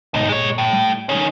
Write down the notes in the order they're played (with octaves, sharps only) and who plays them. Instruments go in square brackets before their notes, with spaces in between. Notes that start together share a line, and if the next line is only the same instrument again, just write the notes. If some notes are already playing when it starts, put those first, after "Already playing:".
[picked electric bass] G1 G#2 B2 [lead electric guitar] D2 D#4
[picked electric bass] G1 A#2 [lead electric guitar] G#3 C#5
[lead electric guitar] A2
[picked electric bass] G3
[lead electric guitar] D#3 C#4